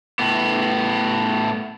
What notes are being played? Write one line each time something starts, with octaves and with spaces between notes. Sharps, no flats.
A2 B3